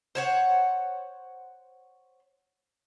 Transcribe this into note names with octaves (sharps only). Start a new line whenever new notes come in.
C5 C#5 F#5